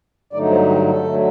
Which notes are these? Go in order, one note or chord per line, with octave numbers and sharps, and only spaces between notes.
G2 D3 F#3 A3 D#4 D5
C5
G4
A4
D3 F#3 A3